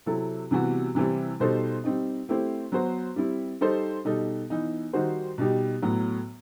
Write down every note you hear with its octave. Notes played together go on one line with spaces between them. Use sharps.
C3 F#3 C4 E4 A4
C3 E3 G3 B3 F#4
C3 E3 G3 C4 E4
B2 G3 D#4 A4 C5
G3 C4 D#4
A3 C4 E4 G4 C5
F#3 B3 F#4 C5
G3 C4 E4
G3 D#4 A4 C5
B2 G3 D#4 A4
E3 B3 D#4
D#3 G3 D#4 F#4 C5
B2 G3 D#4 G4
A2 F#3 B3